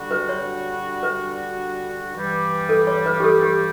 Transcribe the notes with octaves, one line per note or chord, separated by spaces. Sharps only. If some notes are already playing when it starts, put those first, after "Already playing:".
Already playing: D3 G3 D4 F#4
B4
C#5
B4
G2 E3 G3
A4
C#5
B4
G4
A4
G4